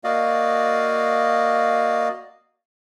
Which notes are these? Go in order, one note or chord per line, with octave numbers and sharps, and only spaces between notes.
A#3 F#4 D5 D#5 F5